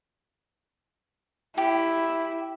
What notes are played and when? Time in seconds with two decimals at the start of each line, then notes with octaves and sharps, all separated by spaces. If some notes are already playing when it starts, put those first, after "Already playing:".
1.58 E4 G4